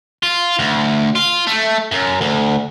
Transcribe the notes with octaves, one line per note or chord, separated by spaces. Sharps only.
F4
D2
F4
A3
F#2
D2